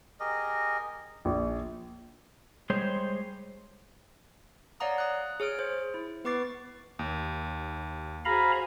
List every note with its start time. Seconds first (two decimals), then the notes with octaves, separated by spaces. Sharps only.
0.20 G4 G#4 A#4 D#5
1.25 A#1
2.70 G3 G#3 G#4 C5 C#5
4.80 C#5 D5 F5 F#5 A#5 D#6
4.98 D#6 F#6
5.40 G#4 C#5 F6 D7
5.59 C5
5.94 E4
6.25 B3 B4 C#6 D6 A6 C7
6.99 D#2
8.25 F#4 G#4 C5 F5 A#5 B5